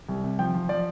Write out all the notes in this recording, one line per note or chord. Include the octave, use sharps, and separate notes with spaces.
C2
C3
F3 G5
F3
F3 D5